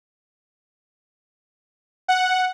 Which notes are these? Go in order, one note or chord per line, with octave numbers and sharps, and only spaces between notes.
F#5